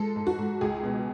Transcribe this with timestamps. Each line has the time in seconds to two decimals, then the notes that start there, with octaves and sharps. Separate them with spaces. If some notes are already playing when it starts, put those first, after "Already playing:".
Already playing: G#3 A4
0.16 G#2
0.27 F#4
0.38 G#2
0.61 C#2 G#4
0.83 B2